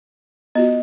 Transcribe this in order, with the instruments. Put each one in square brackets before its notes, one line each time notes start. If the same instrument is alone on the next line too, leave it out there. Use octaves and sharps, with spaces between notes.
[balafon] B3 F4 F#4 [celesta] D#5